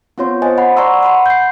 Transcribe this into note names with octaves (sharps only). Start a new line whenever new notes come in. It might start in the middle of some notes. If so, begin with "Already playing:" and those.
B3 C4 F4 C#5 C6
C5 D#5 G#5
F#5 B5
D5 F#5 A#5 C6 C#6 E6
F#5 B5 C6
G6 C7